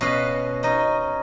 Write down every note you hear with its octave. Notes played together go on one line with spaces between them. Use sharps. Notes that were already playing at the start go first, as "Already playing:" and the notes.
B2 C#4 B4 D#5 F5
C#4 D#4 D#5